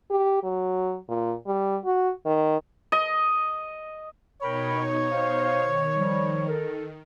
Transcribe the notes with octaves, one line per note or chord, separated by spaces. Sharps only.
G4
F#3
A#2
G3
F#4
D#3
D#5
B2 D#4 A#4 C#5 G5 B5
C5 F5
D#3
F3 G3
A4 A#4